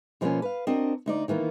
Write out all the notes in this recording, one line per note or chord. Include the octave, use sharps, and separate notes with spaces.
B2 F3 G3 A#3 B3 C#4
B4 F5
C4 D4 F#4 A#4 D#5
D2 D#4 D5
D#3 E3 A#3 B3